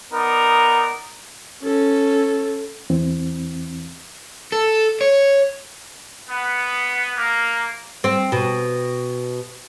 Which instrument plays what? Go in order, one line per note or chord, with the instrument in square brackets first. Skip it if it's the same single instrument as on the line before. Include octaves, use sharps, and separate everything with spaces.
[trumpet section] B3 D#4 A#4 D5
[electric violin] C#4 A4
[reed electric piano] E2 E3 C4
[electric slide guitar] A4
C#5
[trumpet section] B3
A#3
[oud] C4
B2